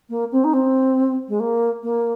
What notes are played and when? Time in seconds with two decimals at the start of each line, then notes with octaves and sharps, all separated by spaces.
0.10 A#3
0.32 C4
0.44 D#4
0.53 C4
1.29 G#3
1.40 A#3
1.83 A#3